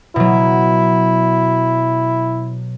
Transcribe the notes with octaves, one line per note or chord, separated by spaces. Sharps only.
B2 F#3 E4